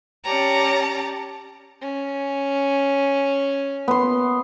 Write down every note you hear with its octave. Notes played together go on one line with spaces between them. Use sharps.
C#4 G4 C#5 D5 A5 A#5
C#4
B3 C6